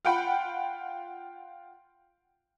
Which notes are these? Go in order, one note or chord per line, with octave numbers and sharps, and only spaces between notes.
F4 F#5 G5 B5